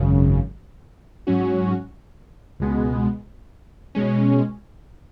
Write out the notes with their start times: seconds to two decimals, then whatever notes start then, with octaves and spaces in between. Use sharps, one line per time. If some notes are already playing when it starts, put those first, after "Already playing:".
Already playing: G#1 F#2 C#3
1.27 G#2 F#3 C#4 F#4
2.60 C#2 B2 G#3 B3
3.95 B2 G#3 C#4